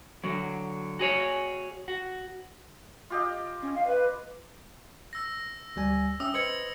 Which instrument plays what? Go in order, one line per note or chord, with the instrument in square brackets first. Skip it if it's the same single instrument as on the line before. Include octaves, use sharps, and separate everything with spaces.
[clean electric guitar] D3 F#3
F#4 G#4 C#5
F#4
[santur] F4 G4 D#5
[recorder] C#4
F5
B4
[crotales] E6 A#6
[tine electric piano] D2 G3 G#5
[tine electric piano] C#4 E5 G5 [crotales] D#6 E6
[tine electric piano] B4 C5 D#5 [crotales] G#6 C#7 F#7